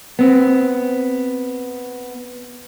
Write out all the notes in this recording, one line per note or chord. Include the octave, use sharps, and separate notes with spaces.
B3 C4